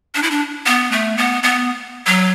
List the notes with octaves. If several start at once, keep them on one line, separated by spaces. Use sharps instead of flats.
D4
E4
D4
B3
A3
B3
B3
F#3